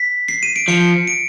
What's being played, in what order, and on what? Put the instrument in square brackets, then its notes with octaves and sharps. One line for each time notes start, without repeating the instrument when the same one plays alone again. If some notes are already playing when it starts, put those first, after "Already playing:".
Already playing: [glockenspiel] B6
C7
D#7
D7
[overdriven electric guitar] F3 [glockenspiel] C#7
[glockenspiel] D7